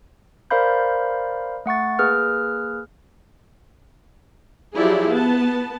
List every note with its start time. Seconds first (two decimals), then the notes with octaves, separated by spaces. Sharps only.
0.51 A#4 C5 D5 F5 B5 G6
1.66 A3 F#5 C#6 A6
1.99 A#3 G#4 B4 F6
4.76 F3 F#3 E4 G4 G#4 D5
5.12 B3 A5